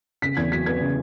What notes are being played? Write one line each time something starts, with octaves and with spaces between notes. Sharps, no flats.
C#3 B6
E2 G#6
F#3 B6
B3 G#6
C#3